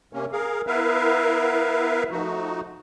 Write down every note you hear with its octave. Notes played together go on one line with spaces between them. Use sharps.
C3 A#3 C#4
G#4 A#4 F5
B3 E4 A#4 B4 E5 F5
F3 A3 D#4 F#4